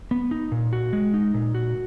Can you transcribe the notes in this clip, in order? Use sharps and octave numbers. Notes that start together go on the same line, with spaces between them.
B3
D#4
A#2
F#4
G#3
D#4
A#2
F#4